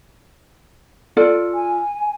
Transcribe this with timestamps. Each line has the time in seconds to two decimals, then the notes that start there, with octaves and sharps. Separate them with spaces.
1.17 F4 A4 D5
1.54 G#5